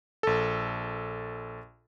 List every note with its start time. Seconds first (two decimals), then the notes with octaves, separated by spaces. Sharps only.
0.23 A#1 A4